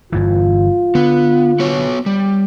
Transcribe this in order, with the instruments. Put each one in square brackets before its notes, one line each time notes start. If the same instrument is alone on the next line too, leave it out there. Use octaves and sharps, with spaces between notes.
[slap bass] G1 G2 E3 [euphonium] F4
[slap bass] D3 [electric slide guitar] B3
[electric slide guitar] B3 F#4 C#5
G3